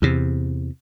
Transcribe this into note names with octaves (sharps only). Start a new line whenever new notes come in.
E2 C3